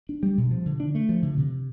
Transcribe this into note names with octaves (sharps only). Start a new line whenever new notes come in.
D4
G3
B2
F3
D3
D4
A3
F3
D3
C3